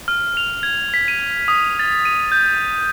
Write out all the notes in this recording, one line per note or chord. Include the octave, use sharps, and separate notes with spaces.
F6
F7
G#6
B6
D#7
D#6
A6
D#7
G6